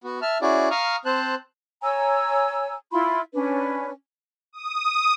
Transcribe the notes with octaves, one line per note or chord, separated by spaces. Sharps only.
B3 F#4
E5 A5 F6
C#4 E4 F#4 G#4 D5
F5 A#5 C#6 D#6 F6
C4 C5 A5 F#6
C#5 G#5 A#5 E6
E4 F4 B5 C6
C#4 D4 B4
D#6